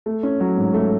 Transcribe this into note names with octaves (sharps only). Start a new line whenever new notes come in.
A3
C#4
F#3
G#2
A3